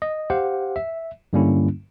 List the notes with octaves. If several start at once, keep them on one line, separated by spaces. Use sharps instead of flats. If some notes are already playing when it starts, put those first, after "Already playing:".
D#5
G4 C5 F5 F#5
E5
G2 D3 G3 A#3 C#4 E4